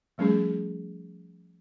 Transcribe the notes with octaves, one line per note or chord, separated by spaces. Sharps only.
F3 G3 A3 C#4 G#4